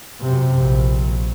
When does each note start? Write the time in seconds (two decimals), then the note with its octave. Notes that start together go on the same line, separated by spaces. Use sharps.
0.21 F#2 C3
0.56 A#1